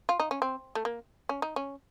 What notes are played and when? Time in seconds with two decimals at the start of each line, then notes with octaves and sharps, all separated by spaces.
0.09 F4
0.20 D#4
0.31 C#4
0.42 C4
0.75 A3
0.85 A#3
1.29 C#4
1.42 D#4
1.56 C#4